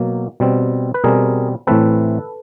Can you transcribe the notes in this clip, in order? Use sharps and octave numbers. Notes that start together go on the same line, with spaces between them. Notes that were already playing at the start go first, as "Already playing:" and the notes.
Already playing: B2 F#3 A#3
B2 G3 C4
B4
B2 G3 C4 G#4 A#4
A2 E3 A3 C4 A4 B4